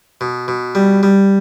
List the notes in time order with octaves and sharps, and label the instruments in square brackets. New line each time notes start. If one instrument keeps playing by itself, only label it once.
[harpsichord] B2
B2
G3
G3